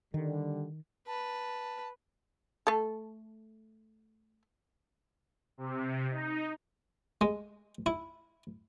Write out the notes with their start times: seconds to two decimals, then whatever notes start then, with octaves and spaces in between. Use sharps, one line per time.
0.14 D3 D#3 G3
1.07 B4 A5
2.67 A3 A4
5.58 C3
6.11 D#4
7.21 G#3
7.86 E4